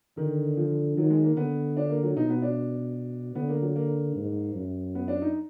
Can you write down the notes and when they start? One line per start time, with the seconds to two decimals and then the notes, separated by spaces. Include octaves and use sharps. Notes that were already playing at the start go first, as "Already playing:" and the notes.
0.17 D3 D#3
0.57 F3
0.97 D#3 F#3
1.10 G#3
1.23 A#3
1.36 D3 B3
1.77 D4
1.90 A#3
2.03 F#3
2.17 B2 D#4
2.30 B3
2.42 D4
3.35 D3 B3
3.49 A#3
3.62 F#3
3.76 A#3
4.16 G#2
4.55 F#2
4.95 B3
5.08 D4
5.22 D#4